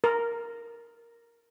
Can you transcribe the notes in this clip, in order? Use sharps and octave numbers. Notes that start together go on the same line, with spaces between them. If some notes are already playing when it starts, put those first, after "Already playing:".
A#4